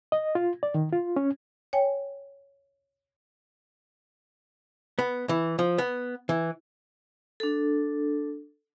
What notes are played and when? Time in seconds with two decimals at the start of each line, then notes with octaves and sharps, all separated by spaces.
0.12 D#5
0.35 F4
0.63 D5
0.75 D#3
0.93 F4
1.16 C#4
1.73 C#5 G5 G#5
4.99 B3
5.29 E3
5.59 F3
5.78 B3
6.29 E3
7.40 D4 A4